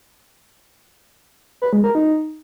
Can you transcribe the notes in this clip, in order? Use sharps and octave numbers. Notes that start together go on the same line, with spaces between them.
B4
G#3
A#4
D#4